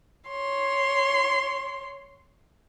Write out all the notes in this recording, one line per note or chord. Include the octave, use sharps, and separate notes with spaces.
C#5 C6